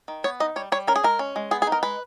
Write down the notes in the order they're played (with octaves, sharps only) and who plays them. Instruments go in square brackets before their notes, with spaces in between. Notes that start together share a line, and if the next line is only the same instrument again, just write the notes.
[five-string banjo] D#3
B3 C#5
D#4 D#5
G3 C#5
G3 C#5
C#4 A#4
G#4
G#3 A#4
C#4
G#3
B3 G#4
G#4
D#4
A#4
G#3 B4